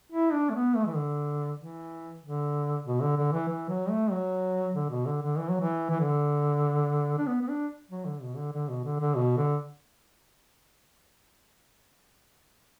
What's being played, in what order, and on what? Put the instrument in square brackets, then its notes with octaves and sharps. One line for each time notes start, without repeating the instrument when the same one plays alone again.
[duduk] E4
D4
A3
B3
A3
E3
D3
E3
D3
B2
D3
D3
E3
E3
F#3
A3
F#3
D3
B2
D3
D3
E3
F#3
E3
E3
D3
D4
B3
B3
D4
F#3
D3
B2
D3
D3
B2
D3
D3
B2
D3